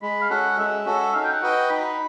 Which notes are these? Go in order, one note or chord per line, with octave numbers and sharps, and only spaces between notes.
G#3 B5
F5
C#4 F#4 A4 F#5
G#3 E5
C#4 F#4 A4
D#4 F5
G5
F#5
F#4 B4 D#5 G5
D#4 B5